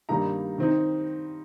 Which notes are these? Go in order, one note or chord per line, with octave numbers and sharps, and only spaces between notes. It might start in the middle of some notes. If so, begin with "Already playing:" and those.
G2 D#3 G3 A#3 D#4 A#5
D#3 C4 D#4